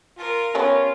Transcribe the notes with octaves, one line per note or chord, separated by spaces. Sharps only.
F4 A#4
G3 B3 C#4 F4 C#5